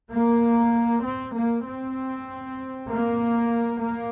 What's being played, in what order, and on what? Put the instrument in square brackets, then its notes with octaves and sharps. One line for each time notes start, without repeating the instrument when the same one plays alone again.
[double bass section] A#3
C4
A#3
C4
A#3
A#3